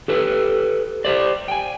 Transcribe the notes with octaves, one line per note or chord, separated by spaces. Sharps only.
G4 A4 B4
G4 C5 D5
G5 G#5